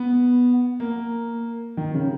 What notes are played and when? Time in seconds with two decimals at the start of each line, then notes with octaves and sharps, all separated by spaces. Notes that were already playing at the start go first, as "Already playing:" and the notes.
Already playing: B3
0.80 A#3
1.77 D#3
1.94 C#3